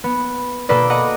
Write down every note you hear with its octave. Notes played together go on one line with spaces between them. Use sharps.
B3
B2 A#3 A4 B4 D5
D#5 F#5 A#5 D6